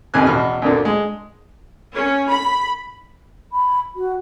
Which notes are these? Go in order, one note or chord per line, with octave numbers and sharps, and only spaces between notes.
A1 D#2 C3 G#5 F#6
E2 B2 F6
D2 A#2 D3
G#3
C#4
B5
B5
F#4